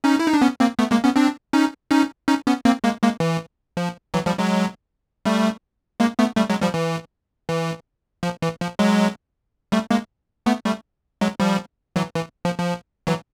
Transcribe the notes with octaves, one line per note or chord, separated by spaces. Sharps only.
C#4 D#4
E4
D#4
D4
B3 C#4
A#3 C4
A3 B3
G#3 A#3
B3 C#4
C4 D4
C#4 D#4
C#4 D#4
C#4 D#4
B3 C#4
A#3 C4
G#3 A#3
G#3 A#3
E3
F3
E3 F#3
F3 G3
F#3 G#3
G3 A3
G#3 A#3
A3 B3
G3 A3
F#3 G#3
F3 G3
E3
E3
F3
E3
F3
F#3 G#3
G3 A3
G#3 A#3
A3 B3
G3 A3
F#3 G#3
F3 G3
E3 F#3
E3
F3
F3
E3 F#3